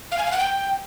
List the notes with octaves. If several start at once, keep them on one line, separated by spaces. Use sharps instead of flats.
F5
G#5
F5
F#5
G5